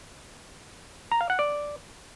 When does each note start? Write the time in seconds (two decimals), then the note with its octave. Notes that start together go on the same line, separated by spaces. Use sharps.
1.11 A#5
1.21 F5
1.30 F#5
1.39 D5